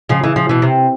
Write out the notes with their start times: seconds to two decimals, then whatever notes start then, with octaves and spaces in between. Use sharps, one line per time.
0.09 C#3 F3
0.24 E3
0.36 F3
0.49 B2 E3
0.62 C3